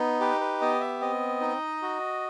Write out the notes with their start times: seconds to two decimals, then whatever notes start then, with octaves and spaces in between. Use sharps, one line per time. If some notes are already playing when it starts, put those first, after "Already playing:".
Already playing: B3 D#4
0.20 G4 B4
0.41 B4
0.61 B3 D#5
0.81 E5
1.01 C4 D#5
1.41 D#4
1.82 F#4